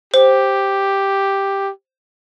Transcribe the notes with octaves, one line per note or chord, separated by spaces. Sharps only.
G4 C5